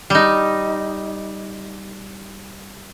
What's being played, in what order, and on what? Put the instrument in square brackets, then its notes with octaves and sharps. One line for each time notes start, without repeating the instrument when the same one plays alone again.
[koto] G3 D#4